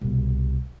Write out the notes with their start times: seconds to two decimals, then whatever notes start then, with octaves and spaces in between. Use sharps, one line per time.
0.01 C2 B2